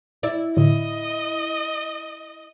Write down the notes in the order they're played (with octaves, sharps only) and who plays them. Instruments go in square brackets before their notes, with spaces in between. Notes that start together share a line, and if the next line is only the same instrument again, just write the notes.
[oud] E4 D5
[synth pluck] A2 D3 [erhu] D#5